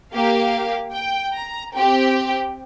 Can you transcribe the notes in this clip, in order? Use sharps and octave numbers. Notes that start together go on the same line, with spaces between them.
A#3 G4 F5
G5
A#5
C4 G4 G5